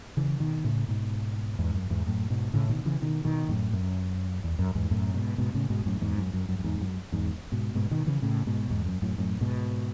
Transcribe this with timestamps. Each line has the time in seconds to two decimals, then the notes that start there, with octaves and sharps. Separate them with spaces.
0.17 C#3 E3
0.40 B2 D#3
0.64 A2 C#3
0.88 G#2 B2
1.59 E2 G#2
1.75 F#2
1.90 E2 G#2
2.06 F#2 A2
2.30 G#2 B2
2.54 A2 C#3
2.69 B2 D#3
2.85 C#3 E3
3.02 B2 D#3
3.25 B2 D#3
3.49 F#2 A2
3.73 F#2
4.44 E2
4.59 F#2
4.75 E2 G#2
4.91 F#2 A2
5.14 G#2 B2
5.38 G#2 B2
5.54 A2 C#3
5.70 G#2 B2
5.86 F#2 A2
6.01 E2 G#2
6.18 F#2
6.33 F#2
6.49 F#2
6.59 F#2
6.64 E2 G#2
6.80 F#2
7.12 E2 G#2
7.52 G#2 B2
7.75 G#2 B2
7.91 B2 D#3
8.06 C#3 E3
8.22 A2 C#3
8.47 G#2 B2
8.70 E2 G#2
8.86 F#2
9.02 F#2 A2
9.18 F#2 A2
9.41 G#2 B2